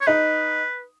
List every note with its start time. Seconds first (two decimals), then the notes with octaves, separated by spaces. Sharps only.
0.01 C#5
0.07 D#4 B4